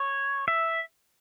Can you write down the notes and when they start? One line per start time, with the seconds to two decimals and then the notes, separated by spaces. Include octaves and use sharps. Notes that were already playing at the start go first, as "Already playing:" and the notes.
Already playing: C#5
0.48 E5